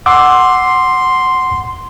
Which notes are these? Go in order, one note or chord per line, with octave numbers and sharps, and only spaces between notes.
F#5 C6 D6 E6